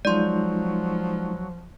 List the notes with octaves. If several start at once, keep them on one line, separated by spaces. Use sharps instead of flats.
F3 F#3 G#3 D#4 F4 D5 C6